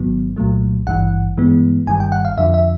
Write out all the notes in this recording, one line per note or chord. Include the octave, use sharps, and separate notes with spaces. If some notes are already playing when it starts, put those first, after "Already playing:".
Already playing: G#1 G#2 D#3 F#3 B3
C2 A#2 F#3 A3
G#1 G2 E3 F#5
G2 E3 G#3 B3
G1 G2 D#3 G3 G#5
G5
F#5
F5
F2 D3 F3 E5
E5